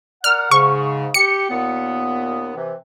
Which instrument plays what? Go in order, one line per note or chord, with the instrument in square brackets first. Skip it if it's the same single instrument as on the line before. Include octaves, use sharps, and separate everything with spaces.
[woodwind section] A#4 D5 F#5 [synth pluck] F6
[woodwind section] G#2 C#3 [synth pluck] C#6
[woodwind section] G4 [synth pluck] C#7
[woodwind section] D#2 A#2 B3
C3 E3